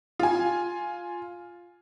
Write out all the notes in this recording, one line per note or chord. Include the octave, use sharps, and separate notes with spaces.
F4 G#5